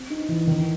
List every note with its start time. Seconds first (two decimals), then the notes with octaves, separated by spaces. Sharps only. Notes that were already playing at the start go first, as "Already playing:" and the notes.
Already playing: C4
0.10 D#4
0.29 E3
0.47 D#3